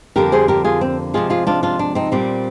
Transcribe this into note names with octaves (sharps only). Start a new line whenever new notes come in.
F2 D3 G3 A#3 G4 A#4
G#4 C5
G4 A#4
F4 G#4
C4
C3 F3 G#3 C4 F4 G#4
F4 G#4
D4 F4
D4 F4
D4
C4 D#4
A#2 G3 C4